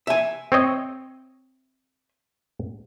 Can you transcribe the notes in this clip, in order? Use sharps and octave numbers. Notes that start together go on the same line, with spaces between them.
E5 G#5
C4 C#5 D#5